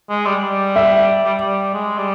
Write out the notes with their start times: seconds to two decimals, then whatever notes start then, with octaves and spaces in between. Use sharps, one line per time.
0.10 G#3
0.26 G3
0.43 G3
0.76 E5
1.25 G3
1.40 G3
1.74 G#3
1.98 G3